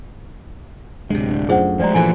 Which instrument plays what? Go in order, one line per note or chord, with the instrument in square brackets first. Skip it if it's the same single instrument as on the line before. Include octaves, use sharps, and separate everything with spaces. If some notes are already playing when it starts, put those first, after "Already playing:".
[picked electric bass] D1 [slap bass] C3 G#3 [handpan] D4
[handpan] D4
[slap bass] F#2 [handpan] A3 F4 [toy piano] G#4 C5 F#5
[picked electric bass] F3 G#3 [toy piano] D4 D5 A#5 [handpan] C5
[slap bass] G2 A#2 [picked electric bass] E3 [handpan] F3 [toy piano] F#4 A4 G#5